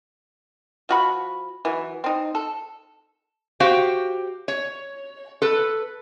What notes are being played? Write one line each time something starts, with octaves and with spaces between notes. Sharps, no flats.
F3 F#4 B5
E3 F#3
C4 D#4
A4
F#4 G4 C5 F5 G5
C#5
A4 B4